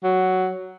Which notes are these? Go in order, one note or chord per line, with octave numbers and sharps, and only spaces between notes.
F#3